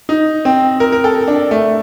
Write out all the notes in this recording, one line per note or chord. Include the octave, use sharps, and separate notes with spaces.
D#4
C4
A#4
A#4
A4
D4
A3